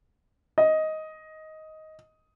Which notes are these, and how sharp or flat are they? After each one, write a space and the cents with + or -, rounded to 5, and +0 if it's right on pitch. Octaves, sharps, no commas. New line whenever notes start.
D#5 +10